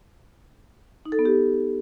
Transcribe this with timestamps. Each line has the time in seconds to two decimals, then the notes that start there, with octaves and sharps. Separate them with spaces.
1.05 D#4
1.12 A4
1.19 B3
1.25 G4